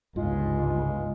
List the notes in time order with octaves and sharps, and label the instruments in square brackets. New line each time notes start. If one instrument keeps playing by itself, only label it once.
[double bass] G1 C#2 [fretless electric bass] G#2 [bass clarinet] G#3 [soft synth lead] F4